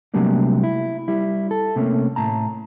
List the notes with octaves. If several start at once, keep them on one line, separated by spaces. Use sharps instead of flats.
C3 F#3 G3 A3 A#3 D4
E4
G3 E4
A4
C3 A3 A#3 C#4
A2 A5 A#5